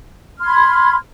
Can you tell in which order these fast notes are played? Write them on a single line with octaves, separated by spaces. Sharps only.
F6 C6 G#6 B5